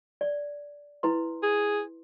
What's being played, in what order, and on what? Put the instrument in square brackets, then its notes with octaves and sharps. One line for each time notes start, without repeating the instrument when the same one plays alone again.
[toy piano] D5
E4 B4 C6
[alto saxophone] G#4